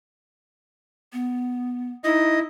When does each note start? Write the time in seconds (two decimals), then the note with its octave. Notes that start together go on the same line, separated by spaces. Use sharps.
1.13 B3
2.04 D#4 E4 D#5